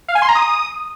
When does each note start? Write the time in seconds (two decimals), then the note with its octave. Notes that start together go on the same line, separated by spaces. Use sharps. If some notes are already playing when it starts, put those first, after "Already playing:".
0.08 F5
0.15 G#5
0.22 C6
0.29 A#5
0.35 D#6